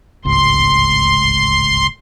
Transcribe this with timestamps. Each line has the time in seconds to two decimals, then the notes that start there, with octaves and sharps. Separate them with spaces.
0.25 D1 G#1 C#2 C6